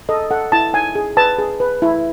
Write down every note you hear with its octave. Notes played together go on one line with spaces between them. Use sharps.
A4 D#5
A4 F#5
E4 A5
D#4 G#5
G#4
B4 A5
G#4
B4
E4